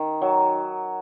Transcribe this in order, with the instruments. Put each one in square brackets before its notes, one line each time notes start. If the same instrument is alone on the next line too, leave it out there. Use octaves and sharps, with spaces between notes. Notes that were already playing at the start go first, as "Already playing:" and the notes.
Already playing: [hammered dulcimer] D#3
F#3